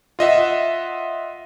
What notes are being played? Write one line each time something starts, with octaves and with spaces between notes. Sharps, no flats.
F4 D#5 E5 F#5